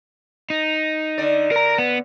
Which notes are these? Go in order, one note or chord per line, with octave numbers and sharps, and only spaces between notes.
D#4
D3 D5
A#4 A#5
B3